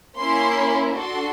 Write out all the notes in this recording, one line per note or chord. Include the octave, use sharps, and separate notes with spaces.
A#3 C#4 E4 C6
D4 F#4 A4 C6